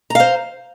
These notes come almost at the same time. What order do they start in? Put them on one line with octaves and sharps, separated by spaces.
A#5 F5 C5